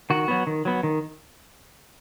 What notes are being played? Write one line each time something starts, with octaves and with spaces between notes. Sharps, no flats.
D#3 F#4
F#3 B3
D#3
F#3 B3
D#3